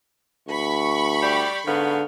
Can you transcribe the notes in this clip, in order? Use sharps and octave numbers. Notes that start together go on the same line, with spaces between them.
D2 B5 C#6
G3 G4 D5
G#2 D3 B3 F5